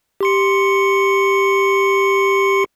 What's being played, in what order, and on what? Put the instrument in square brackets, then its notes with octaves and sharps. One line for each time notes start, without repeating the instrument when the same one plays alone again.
[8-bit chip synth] G4 C6 C#7